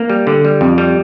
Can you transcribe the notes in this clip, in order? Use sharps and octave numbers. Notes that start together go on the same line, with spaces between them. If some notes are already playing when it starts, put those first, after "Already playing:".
Already playing: A#3
G3
D3
G3
F2
G3